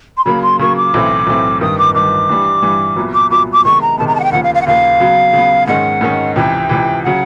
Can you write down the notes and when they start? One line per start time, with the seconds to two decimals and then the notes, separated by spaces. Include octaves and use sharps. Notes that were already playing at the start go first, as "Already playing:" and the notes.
0.17 C6
0.25 C#3 F#3 A#3 B5
0.42 C6
0.59 C#3 F#3 A#3 C#6
0.76 D6
0.94 B1 A2 E3 A3 C4
1.27 B1 A2 E3 A3 C4
1.61 G1 G2 D#3 D#6
1.78 D6
1.95 G1 G2 D#3 D6
2.29 G2 E3 G3
2.62 G2 E3 G3
2.96 C2 A#2 F#3 B3
3.14 D6
3.30 C2 A#2 F#3 B3 D6
3.53 D6
3.65 C3 D#3 G#3 B3 C#6
3.82 A#5
3.98 C3 D#3 G#3 B3 A5
4.07 A#5
4.15 A5
4.20 F#5
4.24 G5
4.32 D#2 C#3 F3 A#3 F#5
4.43 F5
4.55 F5
4.62 F#5
4.67 D#2 C#3 F3 A#3 F5
5.00 C#3 F#3 B3
5.33 C#3 F#3 B3
5.67 G#2 D#3 G#3 C#4 F#5
6.01 G#2 D#3 G#3 C#4
6.36 C#2 C3 E3 G5
6.69 C#2 C3 E3
7.04 C#3 F#3 F#5